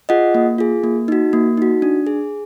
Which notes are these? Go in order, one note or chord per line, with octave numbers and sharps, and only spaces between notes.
F4 G#4 D#5 F#5
A#3
F4 G#4
A#3
D#4 F#4
A#3
D#4 F#4
D4
G#4